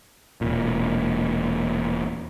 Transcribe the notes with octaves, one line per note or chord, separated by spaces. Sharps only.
E1 A#2